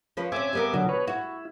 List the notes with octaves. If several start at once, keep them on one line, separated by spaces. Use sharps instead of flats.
F3 C#4 B4
C4 C#4 E5 G#5 D6
G3 B3 A#4
B2 D3 F#3
B4 C#5
E4 F#4